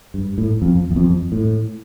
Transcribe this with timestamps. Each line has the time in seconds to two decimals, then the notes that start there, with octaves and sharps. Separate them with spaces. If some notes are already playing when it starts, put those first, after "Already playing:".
0.14 G2
0.38 A2
0.62 F2
0.91 E2
0.96 F2
1.32 A2